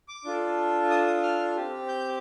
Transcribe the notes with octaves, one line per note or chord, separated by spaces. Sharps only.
D6
D4 F4 A4
D#6
D#6
F6
C4 G4
G6